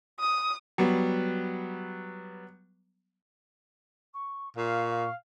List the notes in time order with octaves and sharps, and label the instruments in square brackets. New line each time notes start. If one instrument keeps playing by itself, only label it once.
[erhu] D#6
[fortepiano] F#3 G3 B3
[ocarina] C#6
[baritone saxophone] A#2 [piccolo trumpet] F5 [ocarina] C#6
[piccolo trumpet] F5